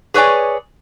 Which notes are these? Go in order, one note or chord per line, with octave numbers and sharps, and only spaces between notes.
G#4 B4 C#5 D5 G#5